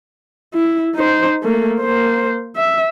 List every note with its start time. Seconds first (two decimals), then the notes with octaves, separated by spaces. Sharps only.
0.54 E4
0.95 D#4 C5
1.43 A3 A#3
1.80 A#3 C5
2.56 E5